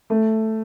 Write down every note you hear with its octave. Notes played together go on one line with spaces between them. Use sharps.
A3